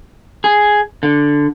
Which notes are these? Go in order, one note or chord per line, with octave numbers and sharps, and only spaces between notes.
G#4
D3